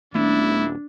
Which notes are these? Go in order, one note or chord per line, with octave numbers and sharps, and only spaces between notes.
D#1 A3 B3 D4 E4